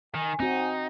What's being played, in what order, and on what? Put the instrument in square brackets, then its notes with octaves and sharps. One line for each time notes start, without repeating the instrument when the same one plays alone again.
[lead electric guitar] D#3 [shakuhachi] G#5
[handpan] C4 F#4 [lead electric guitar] D#4